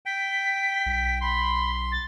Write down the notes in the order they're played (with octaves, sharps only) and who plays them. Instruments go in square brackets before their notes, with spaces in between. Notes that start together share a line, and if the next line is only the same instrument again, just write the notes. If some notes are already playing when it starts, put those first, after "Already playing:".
[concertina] G5 [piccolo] B6
[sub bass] B1
[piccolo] B5 [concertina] C6
[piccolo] A6